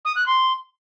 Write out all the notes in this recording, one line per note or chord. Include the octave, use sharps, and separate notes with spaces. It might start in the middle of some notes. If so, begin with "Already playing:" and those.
D#6
F#6
C6